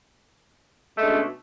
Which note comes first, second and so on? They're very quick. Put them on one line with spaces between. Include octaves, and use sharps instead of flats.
G#3 A3 D4 C#4 B2